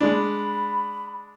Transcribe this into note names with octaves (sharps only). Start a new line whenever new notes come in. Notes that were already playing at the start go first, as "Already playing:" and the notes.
G#3 D4 B5